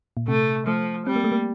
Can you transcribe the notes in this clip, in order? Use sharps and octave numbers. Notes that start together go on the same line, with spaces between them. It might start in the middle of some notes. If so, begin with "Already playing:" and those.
A#2
C3 A3
F3 A3
G3 C4
A#3
A3
A#3